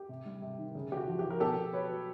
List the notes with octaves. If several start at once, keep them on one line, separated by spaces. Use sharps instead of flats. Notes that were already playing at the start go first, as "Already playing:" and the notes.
Already playing: G4
C3
G3
C3
D#3
C#3
C#3 G4
F#4
F3
F3 G4
A#4
B2 G4 A4
B2
F#3 B4 C#5
F#3